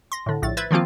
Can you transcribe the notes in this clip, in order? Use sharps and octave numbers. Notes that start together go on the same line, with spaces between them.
C6 A#6
A2 D3
A#1 A2 A6
B4 C5 E5 G#6 A6
D#3 F3 A#3 C4 F4